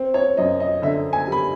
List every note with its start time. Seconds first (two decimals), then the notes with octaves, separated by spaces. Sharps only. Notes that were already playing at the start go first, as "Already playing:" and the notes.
Already playing: C4
0.14 C#5
0.37 F#2 D#5
0.60 D#5
0.82 D3 E5
1.13 G#5
1.27 G3 B5